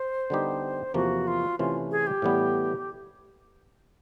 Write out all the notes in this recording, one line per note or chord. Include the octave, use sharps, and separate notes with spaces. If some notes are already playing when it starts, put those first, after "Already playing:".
Already playing: C5
D3 G3 B3 D#4 G4
E2 C3 F3 A#3 F#4
F4
C3 E3 A3 C#4 F4
G#4
G4
A2 E3 G3 B3